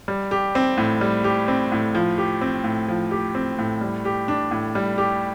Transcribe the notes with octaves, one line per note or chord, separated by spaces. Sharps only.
G3
G4
C4
A2
G3
G4
C4
A2
F3
G4
C4
A2
F3
G4
C4
A2
G3
G4
D4
A2
G3
G4